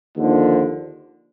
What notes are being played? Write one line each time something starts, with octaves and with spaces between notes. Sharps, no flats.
D#2 D3 F3